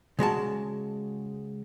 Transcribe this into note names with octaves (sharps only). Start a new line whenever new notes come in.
C#3 G#3 F#4 A5